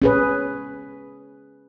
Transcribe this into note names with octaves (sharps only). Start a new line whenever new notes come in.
C#4 G#4 B4